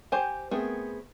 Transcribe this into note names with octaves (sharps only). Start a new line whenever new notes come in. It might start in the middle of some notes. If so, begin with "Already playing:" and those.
G4 C5 G#5
A3 B3 C4 G#4 A#4